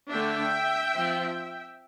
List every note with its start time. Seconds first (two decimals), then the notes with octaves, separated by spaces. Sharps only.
0.11 D3 A3 D4 E5 G5
0.95 F3 C4